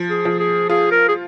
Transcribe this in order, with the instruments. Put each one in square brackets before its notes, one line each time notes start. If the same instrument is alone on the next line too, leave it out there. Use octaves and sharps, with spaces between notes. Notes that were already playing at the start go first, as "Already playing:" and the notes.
Already playing: [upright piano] F3
[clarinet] G#4
[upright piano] F3
[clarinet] G#4
[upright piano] F4 [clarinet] G#4
[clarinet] A#4
G#4